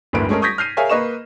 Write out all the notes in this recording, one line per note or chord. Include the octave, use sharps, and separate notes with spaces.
G1 D2 A2 A#3 B4 D7
G#3 A3 C#4 G#4 A#4
C#6 D#6 G6 G#6 A#6 B6
F6 G6 C7 D#7
G#4 A#4 C#5 E5 F5 G#5
A#3 B4 D#5 C#6 E7